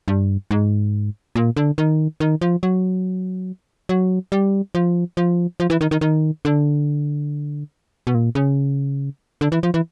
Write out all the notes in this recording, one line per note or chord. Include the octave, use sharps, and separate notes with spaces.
G2
G#2
A#2
D3
D#3
D#3
F3
F#3
F#3
G3
F3
F3
F3
E3
D#3
D#3
D#3
D3
B2
A#2
C#3
D3
E3
F3
E3